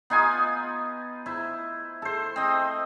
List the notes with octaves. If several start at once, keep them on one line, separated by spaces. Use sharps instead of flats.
B3 D#4 F4 G#5
E4 C5
A4 C5
C4 D#5